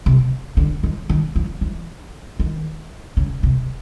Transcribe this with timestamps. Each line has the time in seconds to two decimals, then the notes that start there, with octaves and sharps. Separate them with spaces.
0.06 C3
0.57 D3
0.83 D#3
1.10 D#3
1.36 F3
1.61 E3
2.39 D#3
3.17 C#3
3.43 C3